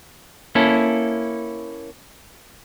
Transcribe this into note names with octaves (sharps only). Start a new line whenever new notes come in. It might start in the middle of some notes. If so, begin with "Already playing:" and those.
A#3 C#4 E4 A4